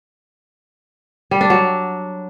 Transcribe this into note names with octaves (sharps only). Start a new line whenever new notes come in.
G3
D4
F#3